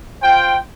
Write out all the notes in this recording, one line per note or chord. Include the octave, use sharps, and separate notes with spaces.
F4 C5 G5